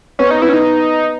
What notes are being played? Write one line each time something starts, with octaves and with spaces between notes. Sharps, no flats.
B3 C#4
D#4
B3 E4
C#4
D#4